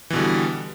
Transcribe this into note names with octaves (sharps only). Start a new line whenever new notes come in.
B2 D3 E3 G3